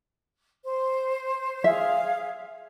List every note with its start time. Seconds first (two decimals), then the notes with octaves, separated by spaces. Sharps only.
0.63 C5
1.64 G#4 E5 F5